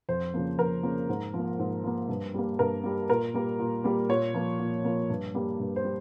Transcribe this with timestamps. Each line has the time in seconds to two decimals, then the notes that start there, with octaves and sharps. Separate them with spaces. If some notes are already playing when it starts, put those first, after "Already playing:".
0.09 F2 C5
0.34 C#3 F3 A#3
0.59 F2 A#4
0.83 C#3 F3 A#3
1.09 G#2
1.34 F3 A#3
1.59 G#2
1.84 F3 A#3
2.09 G2
2.34 G3 A#3
2.59 G2 A#4
2.84 G3 A#3
3.09 A#2 A#4
3.34 G3 A#3
3.59 A#2
3.84 G3 A#3
4.09 A#2 C#5
4.34 F3 A#3
4.59 A#2
4.85 F3 A#3
5.10 G2
5.35 G3 A#3
5.60 G2
5.76 C5
5.85 G3